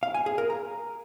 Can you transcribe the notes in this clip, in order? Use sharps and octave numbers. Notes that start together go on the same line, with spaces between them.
F5
G#5
G#4
A#4
A#5